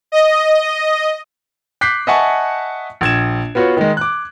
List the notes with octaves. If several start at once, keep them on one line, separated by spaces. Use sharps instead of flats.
D#5
D6 F#6 G6 B6 C7
D#5 E5 F#5 G#5 A5 C#6
A#1 G#6 E7
B3 F4 F#4 C#5
D#3 G#3
D6 F#6